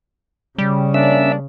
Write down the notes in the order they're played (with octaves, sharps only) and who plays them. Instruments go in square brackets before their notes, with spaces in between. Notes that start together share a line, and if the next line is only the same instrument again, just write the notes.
[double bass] C#3 [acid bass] G3
[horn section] A#3 D4 [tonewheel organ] C#4 E5 E6